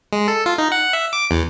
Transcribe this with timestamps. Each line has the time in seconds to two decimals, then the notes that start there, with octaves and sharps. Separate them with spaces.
0.13 G#3
0.28 A4
0.46 F4
0.58 D#4
0.72 F#5
0.93 E5
1.13 D6
1.31 E2